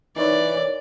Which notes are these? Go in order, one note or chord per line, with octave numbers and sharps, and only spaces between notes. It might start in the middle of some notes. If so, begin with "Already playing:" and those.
E3 D#4 A#4 C#5 D5